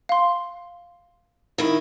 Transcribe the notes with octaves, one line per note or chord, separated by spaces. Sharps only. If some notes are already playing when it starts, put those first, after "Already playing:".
F5 C6
D#3 E4